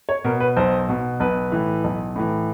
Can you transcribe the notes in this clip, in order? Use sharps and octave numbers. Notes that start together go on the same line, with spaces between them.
C#5
B2 A#4
B4
B1 C5
B2
B1 B4
A2 E3
B1
A2 E3